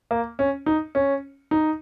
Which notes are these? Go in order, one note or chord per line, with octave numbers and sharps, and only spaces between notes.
A#3
C#4
D#4
C#4
D#4